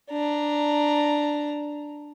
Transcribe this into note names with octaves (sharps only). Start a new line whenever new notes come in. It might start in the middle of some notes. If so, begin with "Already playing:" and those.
D4 A#5